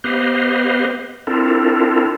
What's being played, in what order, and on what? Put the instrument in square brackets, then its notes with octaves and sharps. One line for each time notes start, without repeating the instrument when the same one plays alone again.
[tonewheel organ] B3 G4 B4 C5 D#5 F5
C4 D4 E4 F4 A4 A#4